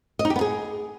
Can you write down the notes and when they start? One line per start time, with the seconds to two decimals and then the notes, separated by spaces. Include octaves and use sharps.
0.19 D#5
0.25 D#4
0.30 G4
0.36 B3
0.41 G#4